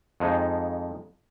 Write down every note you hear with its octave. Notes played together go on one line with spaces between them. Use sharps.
F2 F3 G#3 D#4